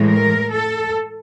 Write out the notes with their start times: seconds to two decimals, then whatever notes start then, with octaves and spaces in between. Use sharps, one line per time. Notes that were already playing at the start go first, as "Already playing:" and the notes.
Already playing: A2 E3 G#3
0.09 A#4
0.53 A4